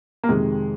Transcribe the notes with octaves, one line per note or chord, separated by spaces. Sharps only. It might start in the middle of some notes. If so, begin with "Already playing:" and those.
A#3
F2 C3 D#3 G#3